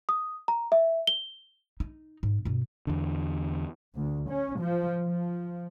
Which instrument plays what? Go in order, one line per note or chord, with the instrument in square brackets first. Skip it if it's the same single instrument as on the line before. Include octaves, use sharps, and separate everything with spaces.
[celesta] D#6
A#5
E5
G7
[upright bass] D#4
G#2
G2 B2
[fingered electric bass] E2 D3
[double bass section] D2
C#4
F3
F3